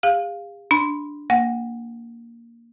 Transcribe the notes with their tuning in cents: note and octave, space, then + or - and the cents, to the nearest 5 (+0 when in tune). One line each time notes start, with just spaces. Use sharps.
G#4 -45 F5 +0
D4 +0 B5 -25
A#3 +0 F#5 -15